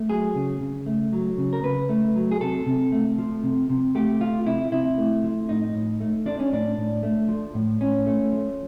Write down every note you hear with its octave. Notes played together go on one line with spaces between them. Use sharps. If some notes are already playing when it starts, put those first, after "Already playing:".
Already playing: A3
F#3 G#4
C#3
C#3
A3
F#3
C#3
A#4
C#3 B4
A3
F#3
G#4
C3 A4
C3
A3
F3
C3
C3
A3 G4
F3 F4
C3 E4
C3 E4
A3
F3
A2 D#4
A2
A3
F3 D4
C#4
A2 D4
A2
A3
F3
A2
A2 C#4
A3
F3